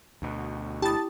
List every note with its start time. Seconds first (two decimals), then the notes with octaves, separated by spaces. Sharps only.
0.22 D2 B2
0.82 E4 G4 A5 B5 D#6 A6